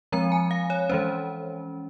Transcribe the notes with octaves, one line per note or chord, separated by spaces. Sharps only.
F3 G#3 C4 A#5
G#5
F5
C#5
E3 G#3 C#4 C5